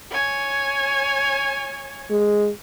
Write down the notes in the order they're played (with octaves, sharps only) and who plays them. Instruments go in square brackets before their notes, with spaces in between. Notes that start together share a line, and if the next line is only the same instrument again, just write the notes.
[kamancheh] C#5 G#5
[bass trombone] G#3